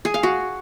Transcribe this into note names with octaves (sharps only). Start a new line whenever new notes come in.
G#4
F5
F#4